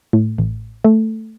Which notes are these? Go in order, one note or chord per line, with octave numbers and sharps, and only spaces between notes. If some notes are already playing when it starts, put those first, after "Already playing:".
A2
A1
A3